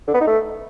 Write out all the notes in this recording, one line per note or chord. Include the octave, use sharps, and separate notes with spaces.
D3
B3
D#4
A3